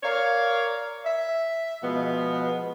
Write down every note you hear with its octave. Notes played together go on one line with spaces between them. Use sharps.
A#4 C#5 D5 F5
E5
B2 F3 G#3 B3